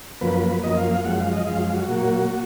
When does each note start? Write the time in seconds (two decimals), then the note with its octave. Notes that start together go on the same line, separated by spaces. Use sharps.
0.21 F#2 F3 A#3 B4
0.42 B4
0.64 F#2 F3 A#3 D#5
0.77 F5
0.91 F5
1.05 F#2 F3 G#3 F#5
1.19 F5
1.33 D#5
1.47 F#2 F3 G#3 F5
1.61 F5
1.74 F#4
1.89 A#2 F#3 A#3